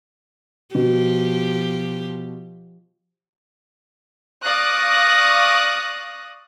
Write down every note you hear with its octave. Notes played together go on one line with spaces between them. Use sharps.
B2 F3 G4
D5 F5 C#6 D#6 F#6 A#6